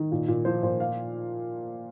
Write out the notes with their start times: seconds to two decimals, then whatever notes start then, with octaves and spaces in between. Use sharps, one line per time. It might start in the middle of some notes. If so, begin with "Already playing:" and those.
Already playing: D#3
0.12 A#2
0.28 A#2
0.45 F3 C5
0.63 A#2 C5
0.80 F5